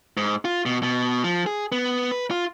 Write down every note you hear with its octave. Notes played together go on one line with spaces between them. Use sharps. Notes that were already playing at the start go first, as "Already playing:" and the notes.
G#2
F4
B2
B2
F3
G#4
B3
B4
F4